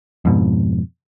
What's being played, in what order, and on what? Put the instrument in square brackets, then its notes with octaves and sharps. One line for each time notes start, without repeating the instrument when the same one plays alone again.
[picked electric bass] F2 G#2 B2